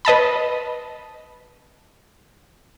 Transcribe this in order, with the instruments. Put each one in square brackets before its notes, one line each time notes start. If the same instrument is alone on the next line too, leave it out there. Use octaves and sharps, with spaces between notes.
[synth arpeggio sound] B4 D#5 A5 B5